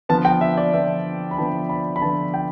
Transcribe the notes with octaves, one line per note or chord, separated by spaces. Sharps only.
D3 F3 B3 A5
G5
E5
D5
D3 F3 B3 E5
B5
D3 F3 B3 A5
B5
B5
D3 F3 B3 A5
G5